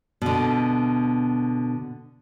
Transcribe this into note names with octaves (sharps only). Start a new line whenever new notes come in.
B2 D3